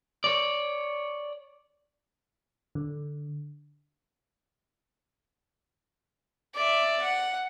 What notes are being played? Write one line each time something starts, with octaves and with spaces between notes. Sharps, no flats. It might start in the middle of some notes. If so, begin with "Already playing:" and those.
C#5 D5
D3
D5 E5
F#5